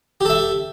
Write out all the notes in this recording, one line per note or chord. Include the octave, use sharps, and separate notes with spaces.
G4 A4 E5